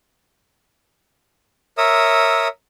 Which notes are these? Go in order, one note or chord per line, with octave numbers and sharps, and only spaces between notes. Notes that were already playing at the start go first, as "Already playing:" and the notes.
A#4 C#5 E5 D#6 E6